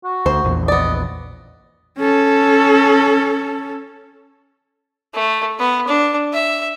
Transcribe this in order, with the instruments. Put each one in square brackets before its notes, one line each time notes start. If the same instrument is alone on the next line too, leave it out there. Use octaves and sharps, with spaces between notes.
[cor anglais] F#4
[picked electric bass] D2 [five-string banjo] C5
[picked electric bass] A#1 E2
[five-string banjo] B3 D5 [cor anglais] D#5
[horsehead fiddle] C#4 A4
[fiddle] A3
B3
D4
E5